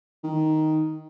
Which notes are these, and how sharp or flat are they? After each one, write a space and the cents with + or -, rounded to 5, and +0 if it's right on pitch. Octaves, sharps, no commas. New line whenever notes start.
D#3 +5